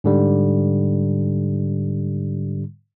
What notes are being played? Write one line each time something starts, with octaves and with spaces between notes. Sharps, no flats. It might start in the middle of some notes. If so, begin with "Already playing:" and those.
G#2 D3 G3